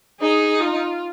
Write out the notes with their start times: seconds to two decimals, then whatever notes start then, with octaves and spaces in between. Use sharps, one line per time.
0.21 D#4 G#4
0.60 F4